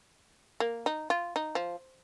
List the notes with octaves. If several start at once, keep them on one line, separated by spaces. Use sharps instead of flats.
A#3
D#4
F4
D#4
F3